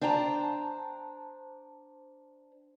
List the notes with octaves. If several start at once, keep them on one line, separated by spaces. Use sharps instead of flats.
D4 C5 G5 A5 A#5